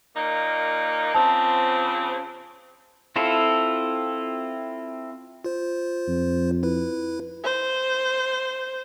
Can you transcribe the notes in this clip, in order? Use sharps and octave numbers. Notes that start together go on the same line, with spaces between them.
A#2 A#3 D#4
C#3 F3 C4 A5
C4 E4 F4 A4
F4 C5
F2
E4 B4
C5